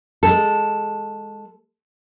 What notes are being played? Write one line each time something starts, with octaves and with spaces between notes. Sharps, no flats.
G#3 A4